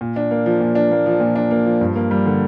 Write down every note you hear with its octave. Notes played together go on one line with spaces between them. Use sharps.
A#2
D4
A#3
F3
A#2
D4
A#3
F3
A#2
D4
A#3
F3
G2
A#3
G3
D3